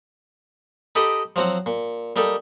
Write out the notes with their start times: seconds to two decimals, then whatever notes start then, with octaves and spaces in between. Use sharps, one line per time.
0.95 D#4 G4 A4 D#5 B5 D6
1.36 F3 F#3 C4 F#4
1.66 A#2
2.16 G3 A#3 D#4 G4 A4